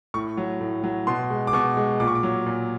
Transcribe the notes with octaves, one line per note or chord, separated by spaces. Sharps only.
A2 C#6
F#3
A2
F#3
B2 C6
G#3
D6
B2 C#6
G#3
A#2 D6
C#6
D6
F#3
A#2